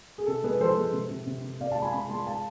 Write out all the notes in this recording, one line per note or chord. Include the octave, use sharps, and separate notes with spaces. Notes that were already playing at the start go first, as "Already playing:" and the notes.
G#4
C3 A4
G#3 G#4 B4
F3 A4 C5
G#3
C3
C3
C3
C3
C3 D5 F5
F5 A5
G#3
G#5 B5
C3 G#5 B5
G#3 A5 C6
F5 A5